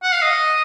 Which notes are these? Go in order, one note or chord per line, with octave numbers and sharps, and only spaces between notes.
F#5
F5
D#5